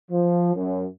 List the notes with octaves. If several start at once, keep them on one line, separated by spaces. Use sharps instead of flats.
F3
F#2